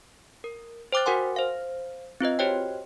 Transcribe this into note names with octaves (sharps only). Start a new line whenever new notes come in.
A#4
C5 G5 D6 F#6 A6
F#4 A#4 F#5 G#5 C6
C5 F5
C4 F4 B4 D#5
F#4 G4 C5 C#5 D#5 G5